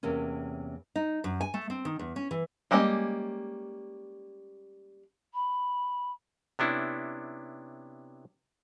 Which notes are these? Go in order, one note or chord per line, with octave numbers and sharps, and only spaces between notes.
E2 C3 A#3 C#4
D#4
F#2
G#5
A3
C4
D#3
E2
C#4
E3
G3 G#3 A#3 C#4 D#5
B5
C3 B3 C#4 D4 E4